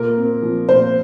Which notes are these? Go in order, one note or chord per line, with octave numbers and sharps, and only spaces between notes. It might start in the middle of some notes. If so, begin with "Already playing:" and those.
Already playing: A#2 A#4
C4
F3
A#2 C5